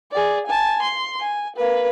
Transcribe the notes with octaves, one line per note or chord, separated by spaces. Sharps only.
G#4 D5
G#5 A5
C6
G#5
A#3 B4